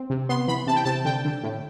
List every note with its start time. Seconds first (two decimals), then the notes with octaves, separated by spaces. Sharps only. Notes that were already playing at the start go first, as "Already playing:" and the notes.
Already playing: C4
0.10 C3
0.29 B3 C6
0.47 E3 B5
0.67 C3 A5
0.76 G5
0.85 C3 A5
1.05 D3 G5
1.25 D3
1.43 A2